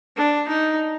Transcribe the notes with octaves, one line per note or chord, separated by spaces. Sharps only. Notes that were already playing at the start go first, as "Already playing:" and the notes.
D4
D#4